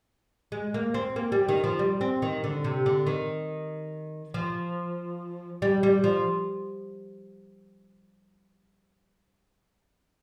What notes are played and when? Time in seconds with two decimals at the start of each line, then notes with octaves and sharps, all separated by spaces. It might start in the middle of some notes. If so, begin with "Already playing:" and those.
0.52 G#3
0.74 A#3
0.94 C4
1.16 A#3
1.32 G3
1.48 D#3
1.64 F3
1.79 G3
2.01 C4
2.22 D#3
2.44 D3
2.64 C3
2.86 D3
3.07 D#3
4.34 F3
5.62 G3
5.83 G3
6.04 F3